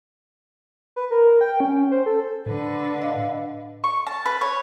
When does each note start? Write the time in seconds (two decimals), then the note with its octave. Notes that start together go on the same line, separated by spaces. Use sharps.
0.96 B4
1.11 A#4
1.41 G5
1.60 C#4
1.91 C5
2.06 A4
2.46 A2 D3 B4
3.02 D#5 F5
3.84 C#6
4.07 A5
4.26 B4
4.41 C#5